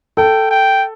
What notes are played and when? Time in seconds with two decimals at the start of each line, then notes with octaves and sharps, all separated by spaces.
0.17 A4 G5
0.51 G5